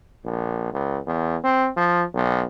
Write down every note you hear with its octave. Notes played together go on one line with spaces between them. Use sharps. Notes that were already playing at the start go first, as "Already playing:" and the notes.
A#1
C#2
E2
C4
F3
B1